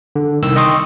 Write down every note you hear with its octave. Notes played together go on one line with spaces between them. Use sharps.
D3
C2 D#3 E6
D#5 G5 C6 C#6 D#6